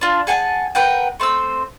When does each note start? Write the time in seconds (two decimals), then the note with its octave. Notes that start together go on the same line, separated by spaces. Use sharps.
0.01 D4 F4
0.27 G#4 F#5 G#5 A5
0.75 A#4 B4 F#5 G5
1.20 A3 C4 C5 E6